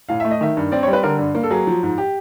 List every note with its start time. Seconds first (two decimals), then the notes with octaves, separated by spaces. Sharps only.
0.09 A2 F5
0.20 A3 E5
0.31 D#5
0.41 D#3 E5
0.57 G2
0.72 C4 D5
0.83 C#5
0.87 G3
0.93 B4
1.03 D3 A#4
1.19 G2
1.35 A#3
1.43 A4
1.51 F#3 G#4
1.67 F3
1.83 G#2
1.98 G4